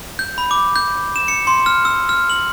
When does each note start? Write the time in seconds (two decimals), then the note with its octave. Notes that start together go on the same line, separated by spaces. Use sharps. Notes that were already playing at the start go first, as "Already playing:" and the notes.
0.19 G6
0.38 B5
0.51 D6
0.76 G6
1.16 E7
1.28 C#7
1.47 C6
1.66 F6
1.85 E6
2.09 F6
2.30 F#7